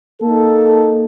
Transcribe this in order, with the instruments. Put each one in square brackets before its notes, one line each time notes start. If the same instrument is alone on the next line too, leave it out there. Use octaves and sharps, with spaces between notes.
[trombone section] A#3 D#4 A4